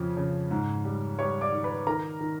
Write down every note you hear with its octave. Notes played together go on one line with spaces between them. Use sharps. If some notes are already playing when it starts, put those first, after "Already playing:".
Already playing: F2 C#3 F3
C#3
G#2
G3
G3 C#5 C#6
D5 D6
D#3
B4 B5
D#3 A#4 A#5
D#3